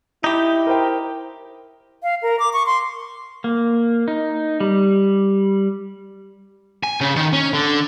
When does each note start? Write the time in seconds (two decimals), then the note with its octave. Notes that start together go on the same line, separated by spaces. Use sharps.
0.24 D#4 E4 G4
0.67 A#4 C5 G5
2.03 F5
2.22 A#4
2.39 D6
2.53 C#6
2.66 C6
3.44 A#3
4.08 D#4
4.60 G3
6.83 G#5
7.01 C#3
7.16 D#3
7.33 C#4
7.53 D3